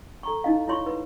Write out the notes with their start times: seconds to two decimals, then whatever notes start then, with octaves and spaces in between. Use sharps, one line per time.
0.23 A4 A#5 C#6
0.44 D#4 E4 D#5 F5
0.68 E4 F4 C#5 C6 C#6
0.86 B4